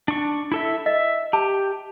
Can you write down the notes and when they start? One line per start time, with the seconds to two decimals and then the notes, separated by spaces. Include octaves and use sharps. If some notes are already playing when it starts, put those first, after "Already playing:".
0.08 D4 C#6
0.52 E4 A4 E5
0.86 D#5 E5
1.33 G4 A5